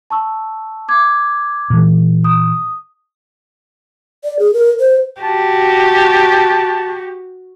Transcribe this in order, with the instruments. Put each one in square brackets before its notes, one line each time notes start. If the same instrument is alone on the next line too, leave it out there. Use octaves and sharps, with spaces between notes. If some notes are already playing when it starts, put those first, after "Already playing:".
[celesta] A5 C#6 E6
D6 G#6
[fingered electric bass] A#2 E3
[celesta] D#6
[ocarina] D5
G#4
A#4
C5
[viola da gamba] F#4 [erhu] G4 [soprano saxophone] A5